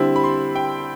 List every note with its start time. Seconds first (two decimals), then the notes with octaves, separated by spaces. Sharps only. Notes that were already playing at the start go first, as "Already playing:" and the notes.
Already playing: D3 G3 C4 E4
0.16 B5
0.24 C6
0.55 G5